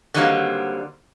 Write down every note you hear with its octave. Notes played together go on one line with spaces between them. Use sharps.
D3 D#3 F#3 G3 A#3 C4